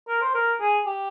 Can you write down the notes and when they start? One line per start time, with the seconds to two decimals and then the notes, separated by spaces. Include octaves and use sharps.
0.08 A#4
0.22 C5
0.34 A#4
0.60 G#4
0.86 G4